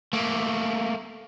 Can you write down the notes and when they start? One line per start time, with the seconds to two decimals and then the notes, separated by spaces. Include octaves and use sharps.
0.13 A3 A#3